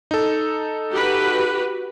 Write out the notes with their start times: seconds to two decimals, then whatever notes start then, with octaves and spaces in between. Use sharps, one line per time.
0.11 D#4 A4
0.92 F#4 G4 B4